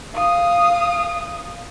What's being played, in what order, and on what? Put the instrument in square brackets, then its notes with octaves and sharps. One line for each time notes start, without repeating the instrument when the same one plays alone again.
[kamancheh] F5 D#6